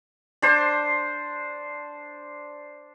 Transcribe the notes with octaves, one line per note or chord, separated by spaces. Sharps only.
D4 C5